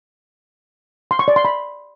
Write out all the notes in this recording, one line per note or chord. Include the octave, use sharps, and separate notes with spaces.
C6
C#6
D5
C6
B5